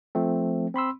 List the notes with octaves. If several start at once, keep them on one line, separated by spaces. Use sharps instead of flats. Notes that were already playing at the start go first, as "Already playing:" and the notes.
F3 A3 C4
C4 B5 C6 E6